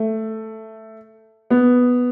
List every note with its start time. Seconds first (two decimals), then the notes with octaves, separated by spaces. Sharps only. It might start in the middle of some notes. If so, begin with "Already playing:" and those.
Already playing: A3
1.50 B3